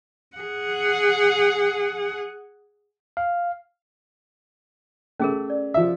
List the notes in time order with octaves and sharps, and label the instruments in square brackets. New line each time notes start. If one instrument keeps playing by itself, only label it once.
[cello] G#4 F#5
[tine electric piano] F5
[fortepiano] A3 [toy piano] C#4 G#4 A#4
[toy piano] D5
[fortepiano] F3 E5